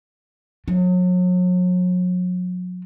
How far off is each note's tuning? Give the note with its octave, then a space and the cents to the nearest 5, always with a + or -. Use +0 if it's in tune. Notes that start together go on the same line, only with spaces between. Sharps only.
F#3 -40